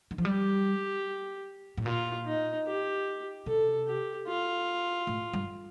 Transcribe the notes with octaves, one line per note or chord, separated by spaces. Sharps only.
D#3
F3
G3 G4
A2
A#2 F4
D#4
G4
C3 A4
G4
F4
A2
G2